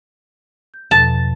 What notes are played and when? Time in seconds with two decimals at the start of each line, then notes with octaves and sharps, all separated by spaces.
0.74 G6
0.91 E2 B2 F3 A5